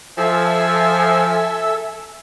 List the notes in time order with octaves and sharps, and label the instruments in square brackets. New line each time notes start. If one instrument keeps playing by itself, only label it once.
[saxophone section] F3 [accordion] A4 E5 E6 [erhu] G#5